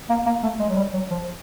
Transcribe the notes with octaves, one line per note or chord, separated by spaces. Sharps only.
A#3
A#3
A3
G#3
F#3
G3
F#3
F3